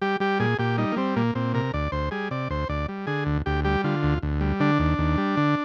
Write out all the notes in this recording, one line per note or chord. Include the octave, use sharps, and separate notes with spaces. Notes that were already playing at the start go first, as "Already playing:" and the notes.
G3 G4
G3 G4
A#2 G#4
A#2 G4
G3 D#4
A#3
G3 C4
A#2 A#3
A#2 C4
C3 A#4
D2 D5
D2 C5
G3 G#4
C3 D5
D2 C5
D2 D5
G3
D3 G#4
D2
D2 G4
G3 G4
D3 F4
D2
D2
G3
D3 D4
D#2
D#2
G3
D3